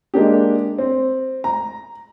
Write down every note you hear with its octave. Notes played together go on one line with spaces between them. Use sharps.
G#3 A#3 D4 G4
C4
A#5